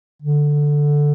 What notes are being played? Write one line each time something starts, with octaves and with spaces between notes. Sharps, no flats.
D3